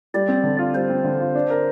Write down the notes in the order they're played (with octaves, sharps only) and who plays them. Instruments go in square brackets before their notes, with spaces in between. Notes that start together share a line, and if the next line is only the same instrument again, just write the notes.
[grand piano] G3 [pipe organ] D5
[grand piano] C4
D3
F4
[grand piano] G3 [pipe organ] C5
[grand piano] C4
D3
F4
D4
A#4